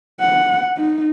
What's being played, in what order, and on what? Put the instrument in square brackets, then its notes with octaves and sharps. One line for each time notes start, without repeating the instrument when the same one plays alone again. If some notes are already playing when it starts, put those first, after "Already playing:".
[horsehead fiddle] F#5
D#4